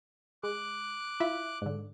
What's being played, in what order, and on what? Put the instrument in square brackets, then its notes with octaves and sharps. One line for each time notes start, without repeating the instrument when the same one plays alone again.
[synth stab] G#3 [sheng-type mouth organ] D6 F#6
[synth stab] E4 F4 E5
G#2 D3